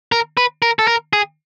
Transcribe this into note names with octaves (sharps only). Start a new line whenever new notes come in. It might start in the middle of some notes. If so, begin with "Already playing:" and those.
A#4
B4
A#4
A4
A#4
G#4